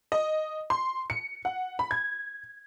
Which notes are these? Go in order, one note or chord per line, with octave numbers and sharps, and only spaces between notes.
D#5
C6
C#7
F#5
B5
G#6